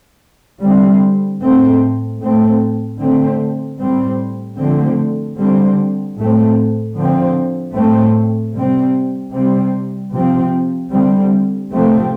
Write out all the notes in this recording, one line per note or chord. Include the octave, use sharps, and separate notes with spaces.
D3 G3 C4
A2 A3 C4
A2 A3 C4
D3 A3 C4
A2 G3 C4
D3 F3 A3 C4
D3 G3 C4
A2 A3 C4
D3 F3 C4
A2 A3 C4
C3 G3 C4
C3 G3 C4
C3 F3 C4
D3 G3 C4
C3 F3 A3 C4